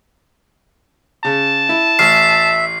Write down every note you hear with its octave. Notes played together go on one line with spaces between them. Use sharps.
C#3 A5
E4
A1 E5 F6 C7